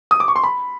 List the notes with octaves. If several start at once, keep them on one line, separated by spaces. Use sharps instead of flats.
D#6
D6
C#6
C6
B5